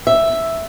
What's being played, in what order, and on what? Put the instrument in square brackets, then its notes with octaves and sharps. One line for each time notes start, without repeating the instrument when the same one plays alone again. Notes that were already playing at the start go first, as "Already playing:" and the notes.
[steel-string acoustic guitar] E5